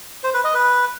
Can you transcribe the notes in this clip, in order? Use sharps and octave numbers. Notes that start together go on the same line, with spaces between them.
C5
B4
D#5
B4